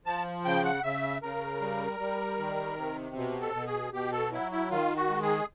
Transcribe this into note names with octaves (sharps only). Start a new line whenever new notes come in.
F3 A5
C#3 G5
F#5
C#3 E5
C#3 A#4
G3
G3
D#3
C3
B2
A4
B2
G#4
B2 G4
A4
F#3 E4
E4
D#3 F4
F#4
G#3
G#4